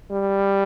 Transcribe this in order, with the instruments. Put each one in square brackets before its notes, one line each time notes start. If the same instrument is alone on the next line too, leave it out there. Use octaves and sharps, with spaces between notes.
[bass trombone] G3